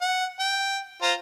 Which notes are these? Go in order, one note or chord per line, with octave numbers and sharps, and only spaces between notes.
F#5
G5
F4 C5 A#5